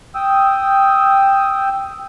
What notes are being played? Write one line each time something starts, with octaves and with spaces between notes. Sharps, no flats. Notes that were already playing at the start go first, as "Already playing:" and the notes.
G5 D#6 E6